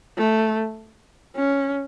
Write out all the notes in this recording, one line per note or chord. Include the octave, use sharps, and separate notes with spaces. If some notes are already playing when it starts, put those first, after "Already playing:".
A3
C#4